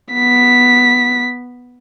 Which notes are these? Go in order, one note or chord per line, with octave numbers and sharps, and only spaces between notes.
B3 B6